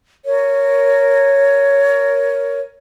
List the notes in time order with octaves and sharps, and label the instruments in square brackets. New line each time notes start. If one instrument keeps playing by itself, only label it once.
[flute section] A#4 C#5